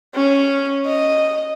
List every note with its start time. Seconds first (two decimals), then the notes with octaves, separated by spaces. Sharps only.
0.15 C#4
0.86 D#5